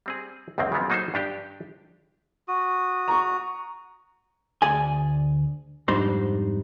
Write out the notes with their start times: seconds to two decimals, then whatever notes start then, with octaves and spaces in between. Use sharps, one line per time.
0.06 G3 C4 G#4
0.58 C#2 F#2 D#3 A#3 C4
0.72 C#3 F3 F#3 B3 C4
0.90 F#3 A#3 D#4 F#4 A4 C5
1.14 G2 D4 G4 G5
2.48 F#4 D#6
3.08 A#5 C#6
4.62 D2 G#4 D5 G#5
5.88 F2 G#2 G3 D4 D#4 C5